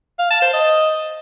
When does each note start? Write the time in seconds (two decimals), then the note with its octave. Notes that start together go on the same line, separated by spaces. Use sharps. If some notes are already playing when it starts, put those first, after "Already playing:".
0.19 F5
0.31 A5
0.42 C5
0.53 D#5